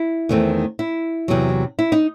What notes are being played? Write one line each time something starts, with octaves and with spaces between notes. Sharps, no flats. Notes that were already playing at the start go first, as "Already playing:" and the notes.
Already playing: E4
E2 D#3 A3 C4
E4
E2 C3 F#3
E4
D#4